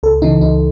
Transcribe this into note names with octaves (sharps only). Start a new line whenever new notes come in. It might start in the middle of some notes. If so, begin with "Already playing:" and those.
C#2 A4
C#3 E3 D#4
C#2 D#4